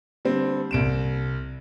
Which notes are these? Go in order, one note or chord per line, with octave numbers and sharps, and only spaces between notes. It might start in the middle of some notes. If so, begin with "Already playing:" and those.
D3 G3 C4
C2 D7 E7